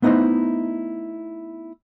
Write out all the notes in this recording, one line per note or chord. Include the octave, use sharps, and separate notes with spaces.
A3 B3 D#4 E4 C5 D#5